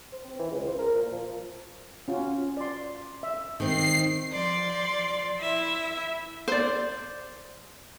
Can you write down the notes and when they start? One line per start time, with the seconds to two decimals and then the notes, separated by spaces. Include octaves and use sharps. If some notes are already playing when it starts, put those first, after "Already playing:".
0.12 C5
0.25 C4
0.39 E3
0.52 C#2
0.68 C5
0.79 A#4
0.96 A#2
1.12 F3
2.08 C#4 F4 F#4
2.57 D5 C6
3.23 E5
3.60 D#3 C4 C7
4.30 F3 D5 C6
5.38 E4 E5
6.48 C5 D5